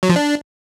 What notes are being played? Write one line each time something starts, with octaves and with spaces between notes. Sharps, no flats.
F#3
F3
D4